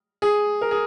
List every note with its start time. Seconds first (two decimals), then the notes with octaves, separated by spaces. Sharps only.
0.22 G#4
0.61 A#4
0.71 G#4